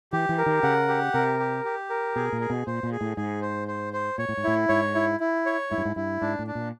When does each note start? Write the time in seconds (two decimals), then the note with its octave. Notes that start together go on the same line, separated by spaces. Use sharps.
0.13 E3 G4
0.29 E3
0.38 A#4
0.46 D#3
0.63 C#3 F#5
0.88 G4
1.14 C3 A#4
1.39 G4
1.65 G4
1.90 A#4
2.16 B2 G#4
2.32 A#2
2.41 G#4
2.50 B2
2.66 A#2 C5
2.83 A#2
2.92 G#4
3.01 A2
3.17 G#2 G#4
3.42 C5
3.68 C5
3.93 C5
4.18 A#2 C#5
4.29 A2
4.37 G#2
4.44 A2 E4
4.69 G#2 C#5
4.95 E4
5.20 E4
5.46 C#5
5.71 G#2 E4
5.78 G2
5.85 G#2
5.96 G2 E4
6.21 G#2 D4
6.39 A2
6.47 D4
6.55 A#2